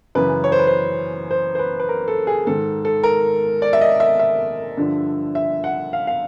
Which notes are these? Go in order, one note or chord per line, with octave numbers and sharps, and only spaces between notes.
F#2 C#3 E3 B4
C#5
C5
B4
C5
C5
C5
B4
B4
A#4
A4
G#4
G#2 D#3 A4
A4
A#4
D5
E5
D#5
E5
E5
G2 D3 F3
E5
F#5
F5
F5